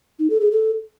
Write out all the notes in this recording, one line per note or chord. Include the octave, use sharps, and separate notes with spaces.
D#4
A4
G#4
A4